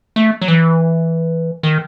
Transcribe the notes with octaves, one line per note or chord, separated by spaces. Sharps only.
A3
F#3
E3
D#3